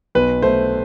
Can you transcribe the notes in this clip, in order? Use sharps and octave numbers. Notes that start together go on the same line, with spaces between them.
B1 B4
A3 C5